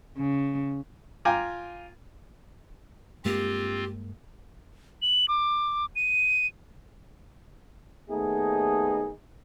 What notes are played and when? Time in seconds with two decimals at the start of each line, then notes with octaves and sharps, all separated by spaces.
0.18 C#3
1.25 F4 G5 G#5 A#5 D6
3.25 G2 G#3 A#3 C4 F4 G4
5.02 F#7
5.28 D6
5.96 D#7
8.10 D#2 A3 B3 D#4 G#4